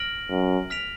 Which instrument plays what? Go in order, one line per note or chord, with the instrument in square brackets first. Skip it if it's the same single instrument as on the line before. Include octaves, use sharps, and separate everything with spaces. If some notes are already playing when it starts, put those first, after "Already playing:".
Already playing: [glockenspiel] F6 A#6 D7 F#7
[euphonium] F#2
[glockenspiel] F6 B6 D7 F7